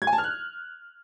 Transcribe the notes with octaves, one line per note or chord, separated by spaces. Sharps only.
G#6
G#5
A5
F6
F#6